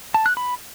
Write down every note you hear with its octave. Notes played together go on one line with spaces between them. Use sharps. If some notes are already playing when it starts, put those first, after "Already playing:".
A5
F#6
B5